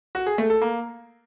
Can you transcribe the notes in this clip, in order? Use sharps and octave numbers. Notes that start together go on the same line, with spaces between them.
F#4
G#4
A3
A4
A#3